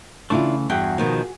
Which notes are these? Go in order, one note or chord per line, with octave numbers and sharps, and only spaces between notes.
C#3 E3 A3 D4 E4 F4
E2 G2 F#4 G#4 G5
B2 D#3 F3